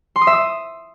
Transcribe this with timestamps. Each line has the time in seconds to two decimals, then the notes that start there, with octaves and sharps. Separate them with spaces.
0.16 C6
0.21 D#6
0.27 E5
0.33 D#6